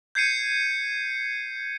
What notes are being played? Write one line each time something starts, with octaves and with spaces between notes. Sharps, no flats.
G6 G#6 C7 C#7 D#7